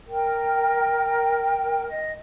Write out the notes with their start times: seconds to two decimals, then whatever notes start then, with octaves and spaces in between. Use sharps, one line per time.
0.07 A#4 G5
1.88 D#5